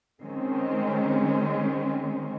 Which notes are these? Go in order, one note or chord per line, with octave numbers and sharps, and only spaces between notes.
D#3 G#3 C4 C#4